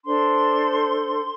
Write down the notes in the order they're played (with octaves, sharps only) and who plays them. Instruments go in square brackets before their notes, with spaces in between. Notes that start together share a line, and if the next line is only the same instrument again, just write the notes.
[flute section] D4 A4 C5 C6